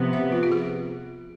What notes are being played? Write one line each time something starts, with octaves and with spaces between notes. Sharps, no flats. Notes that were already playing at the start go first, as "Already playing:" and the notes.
Already playing: C3 F3 B3
E5
F4
F4
G#4